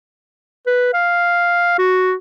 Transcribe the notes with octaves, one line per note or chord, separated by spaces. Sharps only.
B4
F5
F#4